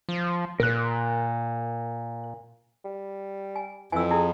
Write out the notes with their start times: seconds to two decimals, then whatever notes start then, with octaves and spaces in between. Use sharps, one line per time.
0.09 F3
0.60 A#2 A#4 F#6
2.85 G3
3.56 G#5
3.92 F2 E3 G#5 E6
4.11 E4 G#4